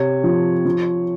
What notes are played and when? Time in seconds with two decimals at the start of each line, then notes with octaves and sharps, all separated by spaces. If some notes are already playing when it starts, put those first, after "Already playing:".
Already playing: C3 C#5
0.24 F3
0.66 F3